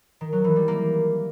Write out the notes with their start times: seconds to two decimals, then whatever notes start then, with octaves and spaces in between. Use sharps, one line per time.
0.21 D#3
0.33 F#3
0.44 E3
0.56 G3
0.68 A#3